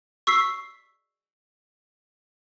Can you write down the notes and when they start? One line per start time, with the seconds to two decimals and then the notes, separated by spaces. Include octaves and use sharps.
0.27 C#6 E6 B6 C7